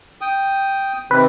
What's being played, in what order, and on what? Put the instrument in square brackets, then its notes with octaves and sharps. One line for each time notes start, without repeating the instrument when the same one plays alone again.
[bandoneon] G5 D#6
[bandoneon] C3 D#3 C4 [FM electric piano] B4